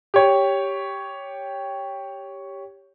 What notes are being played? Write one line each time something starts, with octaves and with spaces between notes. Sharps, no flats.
G4 C#5